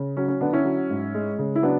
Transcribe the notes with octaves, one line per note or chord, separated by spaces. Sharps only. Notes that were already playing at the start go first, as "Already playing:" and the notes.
Already playing: C#3
F#3 C#4
C#4
D3 B3 D4
C#4 E4
F#3
G#2
G#3
C#3
E4
F#3 B3 D4